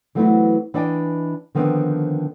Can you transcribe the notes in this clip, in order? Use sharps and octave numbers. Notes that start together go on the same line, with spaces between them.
E3 F#3 A3 B3 C4 E4
E3 D4 D5 D#5 G5 G#5
D3 D#3 F3 B3 C4 D4